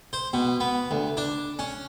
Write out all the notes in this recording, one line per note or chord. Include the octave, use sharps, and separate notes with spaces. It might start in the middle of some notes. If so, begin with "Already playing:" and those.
C5
B2
B3
D2
D4
C#4